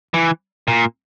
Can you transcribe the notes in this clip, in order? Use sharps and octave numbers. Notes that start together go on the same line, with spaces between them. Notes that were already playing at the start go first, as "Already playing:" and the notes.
E3
A#2